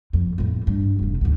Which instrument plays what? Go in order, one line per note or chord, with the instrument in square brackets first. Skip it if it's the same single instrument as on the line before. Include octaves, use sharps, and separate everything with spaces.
[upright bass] F2
F2 A2
G2
E1 C3
D2 G#2